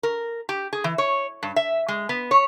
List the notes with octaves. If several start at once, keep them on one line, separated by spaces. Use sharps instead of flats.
A#4
G4
G#4
E3
C#5
G2
E5
G#3
B3
C#5